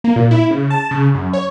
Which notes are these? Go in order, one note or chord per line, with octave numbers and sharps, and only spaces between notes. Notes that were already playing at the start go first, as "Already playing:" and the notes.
A#3
A#2
E4
C#3
A5
C#3
F#2
C#5